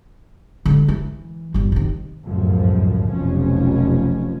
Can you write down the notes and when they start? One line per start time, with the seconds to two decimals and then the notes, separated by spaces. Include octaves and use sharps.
0.66 D3 G#3
0.88 E3
1.54 G1 C2
1.72 C3 D#3
2.24 G1 C#2 F#2 A2 F3
3.11 F1 B1 F3 C#4